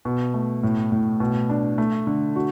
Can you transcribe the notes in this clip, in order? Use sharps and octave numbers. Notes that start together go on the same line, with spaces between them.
B2
A3
A2
A2
B2
D4
A3
D3
F#4